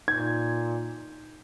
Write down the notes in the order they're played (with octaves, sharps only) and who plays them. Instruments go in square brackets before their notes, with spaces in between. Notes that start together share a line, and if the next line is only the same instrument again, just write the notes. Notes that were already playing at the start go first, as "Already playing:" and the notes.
[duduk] A#2 [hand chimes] D#4 G6 [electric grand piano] G#6